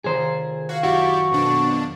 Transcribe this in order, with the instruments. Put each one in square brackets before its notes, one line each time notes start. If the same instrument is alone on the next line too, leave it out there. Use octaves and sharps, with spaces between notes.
[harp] F1 D#3 A#5 [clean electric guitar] G#4 C5
[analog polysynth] F#4 [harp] C#5 F5 C7
[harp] F#2 [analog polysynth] E4 G4 D5 [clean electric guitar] F#4 [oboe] C#6
[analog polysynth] F2 B2 D4